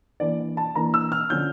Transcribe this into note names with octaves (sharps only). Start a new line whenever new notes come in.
E3 A#3 D4 D5
A5
E3 A#3 D4 A#5
E6
F6
D3 F3 C#4 G6